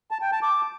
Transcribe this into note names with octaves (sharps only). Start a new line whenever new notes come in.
A5
G5
A5
D6